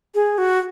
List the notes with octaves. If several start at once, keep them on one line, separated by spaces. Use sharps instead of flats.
G#4
F#4